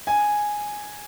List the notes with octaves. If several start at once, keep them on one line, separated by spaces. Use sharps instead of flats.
G#5